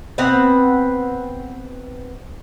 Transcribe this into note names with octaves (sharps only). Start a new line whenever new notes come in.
B3 C4 B4 F#5